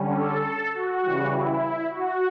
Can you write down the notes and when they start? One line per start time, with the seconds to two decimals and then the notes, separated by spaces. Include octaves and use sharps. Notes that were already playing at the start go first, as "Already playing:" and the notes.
Already playing: D3 G3 C#4
0.15 A4
0.73 F#4
1.03 C#3 E3 G3
1.32 E4
1.90 F#4